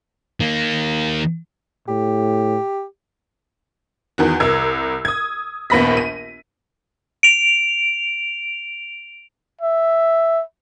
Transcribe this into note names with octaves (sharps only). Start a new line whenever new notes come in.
D#3 A#3
A2 G4
E2 D#3 F#4
C2 A#4 E6 G#6
D#6 G#6
A#1 D#2 B3 B5 A#6 B6
D#7
D7 F7
E5